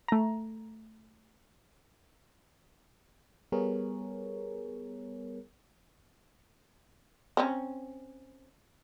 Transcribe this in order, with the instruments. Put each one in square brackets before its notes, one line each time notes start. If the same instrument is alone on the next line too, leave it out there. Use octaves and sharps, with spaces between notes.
[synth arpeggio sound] A3 A#5
[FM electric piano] G3 B3 G#4 A#4 C#5
[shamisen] C4 C#4 A#5